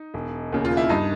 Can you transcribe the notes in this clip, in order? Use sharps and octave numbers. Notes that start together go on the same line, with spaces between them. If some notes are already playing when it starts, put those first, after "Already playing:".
Already playing: D#4
E1
D#2 C#3
F4
E4
G2 D#4